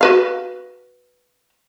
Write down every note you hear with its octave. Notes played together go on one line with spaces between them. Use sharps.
F#4 B4 F5